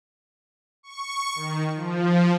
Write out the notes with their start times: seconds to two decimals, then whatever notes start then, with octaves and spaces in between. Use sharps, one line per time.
0.83 C#6
1.35 D#3
1.76 F3